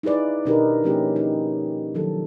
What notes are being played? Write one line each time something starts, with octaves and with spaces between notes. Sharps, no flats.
D#4 E4 G#4 B4 D5
B2 D4 D#4 G4 A#4 B4
F3 A#3 C#4 G4 G#4
D#4
D#3 F3 F#3 A4